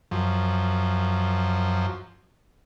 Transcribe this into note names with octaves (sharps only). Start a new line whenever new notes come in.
F#2 F3